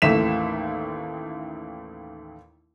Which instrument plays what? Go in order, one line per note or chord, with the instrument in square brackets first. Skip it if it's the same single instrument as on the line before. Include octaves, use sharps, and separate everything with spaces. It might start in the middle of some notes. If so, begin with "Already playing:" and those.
[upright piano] A1 D#2 A3 B6 E7